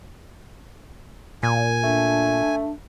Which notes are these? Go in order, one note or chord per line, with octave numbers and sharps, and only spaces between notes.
A#2 G#5
A3 D4